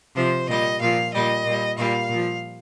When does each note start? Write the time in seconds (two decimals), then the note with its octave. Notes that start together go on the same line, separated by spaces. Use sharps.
0.16 C3 F3 C5
0.49 A#2 G3 D#5
0.81 A#2 F3 F5
1.13 A#2 G3 D#5
1.46 A#2 G3
1.79 A#2 G3 F5
2.10 A#2 F3